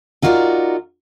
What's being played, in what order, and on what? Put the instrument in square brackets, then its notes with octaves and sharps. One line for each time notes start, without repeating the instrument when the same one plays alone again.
[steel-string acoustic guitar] D#4 F4 F#4 A#4 C#5 D5